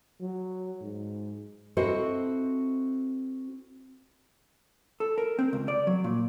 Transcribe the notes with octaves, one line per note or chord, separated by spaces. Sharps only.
F#3
G#2
C4 E4 F#4 A4 C5 D#5
A4
A#4
C4
C#2
D5
F#3
A#2